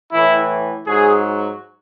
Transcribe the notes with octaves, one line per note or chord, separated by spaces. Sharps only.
A2 E3 E4
G#2 F#3 G#4